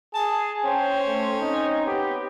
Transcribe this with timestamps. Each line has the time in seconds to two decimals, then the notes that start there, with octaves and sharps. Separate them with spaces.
0.15 G#4 G#5 A5
0.65 C#4 C5 G5
1.07 A3
1.41 C4 D#4
1.86 B3 G4